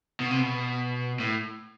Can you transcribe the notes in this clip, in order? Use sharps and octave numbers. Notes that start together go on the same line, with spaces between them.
B2
C3
B2
A2